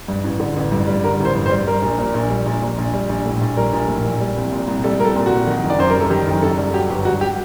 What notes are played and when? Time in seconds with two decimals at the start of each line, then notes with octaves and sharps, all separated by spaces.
0.08 G2
0.24 A1
0.40 D3
0.56 A1
0.72 G2
0.87 G3
1.04 D3 A#4
1.20 A1
1.25 C5
1.35 G2
1.46 C5
1.51 G3
1.67 G3 A#4
1.82 A#1
1.98 A#2
2.14 A#1
2.30 G3
2.46 A#1
2.62 A#2
2.78 A#1
2.94 G3
3.09 A#1
3.25 A2
3.41 A#1
3.57 G3 A#4
3.73 A#1
3.88 A2
4.05 A#1
4.20 G3
4.36 C2
4.52 A#2
4.68 C2
4.84 G3 A4
5.00 C2 A4 A#4
5.16 A#2
5.26 F#4
5.31 C2
5.47 D#3
5.63 F#1
5.70 D5
5.79 F#2 C5
5.90 G3 A#4
6.00 A4
6.10 D#3 G4
6.27 F#1
6.42 F#2 A4
6.58 G3
6.74 F#3 G4
6.90 G1 G4
7.05 G2 F#4
7.21 G4